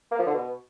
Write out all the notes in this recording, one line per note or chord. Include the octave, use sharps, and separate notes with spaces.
A#3
F3
D3
B2